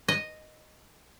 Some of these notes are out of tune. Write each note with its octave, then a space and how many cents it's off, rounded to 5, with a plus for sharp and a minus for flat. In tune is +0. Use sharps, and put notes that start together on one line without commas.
D#5 -5